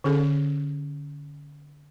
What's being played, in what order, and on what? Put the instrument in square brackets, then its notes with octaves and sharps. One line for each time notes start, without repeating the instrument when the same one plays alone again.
[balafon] D3 C#4 G#4 A4